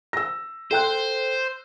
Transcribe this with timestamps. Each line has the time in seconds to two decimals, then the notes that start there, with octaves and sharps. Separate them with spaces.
0.13 E6 A#6
0.71 A4 C5 G5 F#6